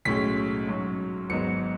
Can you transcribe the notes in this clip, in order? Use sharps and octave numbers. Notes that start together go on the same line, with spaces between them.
B1 A2 G#3 C#4 B6
G#2 F#3 C#4
G#1 G#2 F#3 B3 D#4 C#7